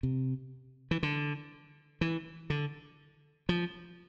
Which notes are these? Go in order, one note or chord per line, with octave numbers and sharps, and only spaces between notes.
C3
E3
D3
E3
D3
F3